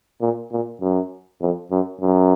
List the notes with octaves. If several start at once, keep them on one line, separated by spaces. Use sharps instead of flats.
A#2
A#2
F#2
F2
F#2
F#2